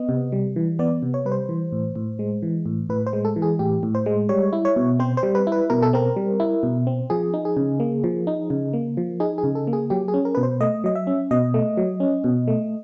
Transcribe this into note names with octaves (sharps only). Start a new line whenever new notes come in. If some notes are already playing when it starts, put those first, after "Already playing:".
Already playing: B3 D#5
C3
G3
E3
B3 D5
C3
C#5
G3 B4
C5
E3
A2
A2
G#3
E3
A2
A2 B4
C5
G#3
A4
E3
G#4
A2 G4
A2
C5
G#3
G3 C#5
E4
C#5
B2
C4 C5
C5
G3
B4
E4
B4
B2 A#4
A4
C4 A#4
G3
E4
B2
C4
F3 G#4
D#4
G#4
C#3
A#3
F3
D#4
C#3
A#3
F3
D#4 G#4
G#4
C#3
A4
A#3
G#4
F#3 G4
G#4
C#4
A#4
B2 B4
C5
A3 D#5
F#3 D#5
E5
C#4
B2 D#5
A3
F#3
C#4
B2
A3